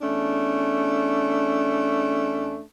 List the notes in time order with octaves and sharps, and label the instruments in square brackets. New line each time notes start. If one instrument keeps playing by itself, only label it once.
[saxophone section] E2 A3 C#4 D4